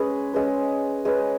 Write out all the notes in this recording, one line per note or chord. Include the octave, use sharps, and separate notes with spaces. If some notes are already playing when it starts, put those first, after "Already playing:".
Already playing: G#3 C#4 G#4 B4
G#3 C#4 G#4 B4
G#3 C#4 G#4 B4